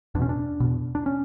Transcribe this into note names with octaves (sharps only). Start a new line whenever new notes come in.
E2 B2 C#4 D4
D4
E2 B2
D4
C#4